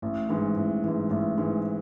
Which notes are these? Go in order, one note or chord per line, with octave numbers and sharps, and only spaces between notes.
A1
G#2 E3
A1
G#2 E3
A1
G#2 E3